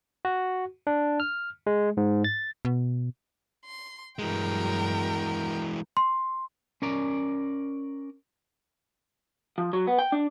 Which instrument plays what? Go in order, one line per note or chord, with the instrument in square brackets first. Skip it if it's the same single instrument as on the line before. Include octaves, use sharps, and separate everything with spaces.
[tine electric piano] F#4
D4
F6
G#3
G#2
A6
[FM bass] B2
[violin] C6
[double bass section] G2 F#3 [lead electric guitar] E3 G#3 [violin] A#4 G5
[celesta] C6
[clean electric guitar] C#4 A#4 D5 A#5
F3
F#3
B3
G5
D4